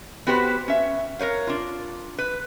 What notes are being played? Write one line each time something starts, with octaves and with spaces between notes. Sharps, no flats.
B3 F#4 G4 B4 C5
C#4 E5
A#4 B4 C#5 F5
D4 F4
B4